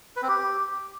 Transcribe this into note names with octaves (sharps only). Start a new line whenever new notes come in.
B4
C4
G4